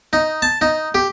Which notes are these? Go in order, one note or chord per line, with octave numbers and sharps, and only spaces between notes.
D#4
A5
D#4
G4